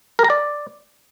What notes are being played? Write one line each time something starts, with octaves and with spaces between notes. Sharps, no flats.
A#4
A#5
D5